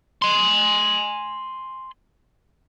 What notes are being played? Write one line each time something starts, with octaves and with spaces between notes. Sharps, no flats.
G#5 C6